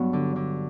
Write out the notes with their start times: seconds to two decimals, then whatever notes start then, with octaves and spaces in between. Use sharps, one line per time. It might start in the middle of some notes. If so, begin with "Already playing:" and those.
Already playing: G2 F#3 B3
0.13 D3
0.36 D3